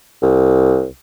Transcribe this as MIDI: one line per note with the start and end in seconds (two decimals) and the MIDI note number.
0.22 0.87 36